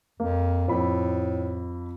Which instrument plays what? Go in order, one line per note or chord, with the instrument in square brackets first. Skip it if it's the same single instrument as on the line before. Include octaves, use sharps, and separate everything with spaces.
[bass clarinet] F2 [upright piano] A#3
[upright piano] F2 B5 [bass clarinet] A2